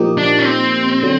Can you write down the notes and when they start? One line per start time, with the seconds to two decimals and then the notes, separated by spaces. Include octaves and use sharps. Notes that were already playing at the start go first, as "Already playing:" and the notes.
Already playing: A#2 F3 A#3 D#4 G4
0.18 D4
0.39 C#4
0.46 C4
1.03 D3 F#3